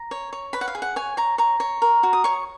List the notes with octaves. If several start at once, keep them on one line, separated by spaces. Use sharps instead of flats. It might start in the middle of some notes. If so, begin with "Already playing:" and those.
Already playing: A#5
C#5
C#5
B4 B5
F#5
F5
G#4
F#5
C#5 G#5
C#5 A#5
C#5 A#5
C#5
A#4
F#4
D#6
C#5 C#6